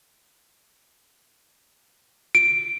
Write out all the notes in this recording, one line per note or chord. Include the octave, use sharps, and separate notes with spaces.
D7